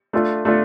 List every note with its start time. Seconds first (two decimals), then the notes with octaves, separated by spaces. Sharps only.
0.13 A3 D4 F4 A4
0.45 A3 D4 F4 A4